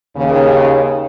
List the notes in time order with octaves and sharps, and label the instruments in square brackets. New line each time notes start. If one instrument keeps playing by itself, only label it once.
[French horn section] D#2 C#3